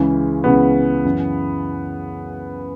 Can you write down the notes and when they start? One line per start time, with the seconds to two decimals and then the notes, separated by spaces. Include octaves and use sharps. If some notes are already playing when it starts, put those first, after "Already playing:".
Already playing: C#2 C#3 E3
0.44 C#2 C#3 E3 B3
1.05 F#2 E3